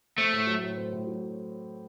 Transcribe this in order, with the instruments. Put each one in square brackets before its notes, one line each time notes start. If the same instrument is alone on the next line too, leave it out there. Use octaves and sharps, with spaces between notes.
[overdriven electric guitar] A3 [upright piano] C4
[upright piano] A2
F#3
A2
C4
A2
F#3